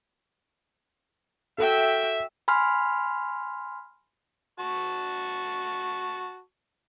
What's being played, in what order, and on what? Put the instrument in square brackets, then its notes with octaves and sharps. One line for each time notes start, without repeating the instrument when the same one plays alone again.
[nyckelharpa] F#4 G5 [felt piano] A4 [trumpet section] E5
[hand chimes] G#5 B5 C6 F6
[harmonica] F#4 A5 C#6